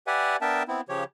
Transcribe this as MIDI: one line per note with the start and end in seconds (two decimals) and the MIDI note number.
0.07 0.36 67
0.07 0.36 71
0.07 0.36 74
0.07 0.36 76
0.07 0.36 78
0.07 0.36 80
0.41 0.63 59
0.41 0.63 62
0.41 0.63 70
0.41 0.63 76
0.41 0.63 79
0.41 0.63 81
0.68 0.81 59
0.68 0.81 60
0.68 0.81 64
0.89 1.04 49
0.89 1.04 53
0.89 1.04 67
0.89 1.04 73